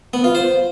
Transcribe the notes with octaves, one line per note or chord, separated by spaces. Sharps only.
B3
F4
C5